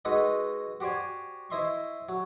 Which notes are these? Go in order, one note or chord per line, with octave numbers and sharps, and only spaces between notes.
G#3 D#4 F#4 A4 B4 D#5
F#4 G4 C5 D5 G#5
E4 C5 D#5 E5 C6 C#6
F#3